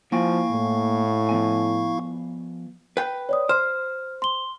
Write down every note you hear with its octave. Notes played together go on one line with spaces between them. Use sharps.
F3 A#3 E4 F5 G5 G#5 C#6
A2
F3 B3 G#5
B4 G5
C#5 D5 D#6
C5 F6
C6 G7